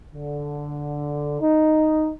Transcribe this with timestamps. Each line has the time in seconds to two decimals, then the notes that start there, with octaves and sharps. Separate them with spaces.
0.13 D3
1.40 D#4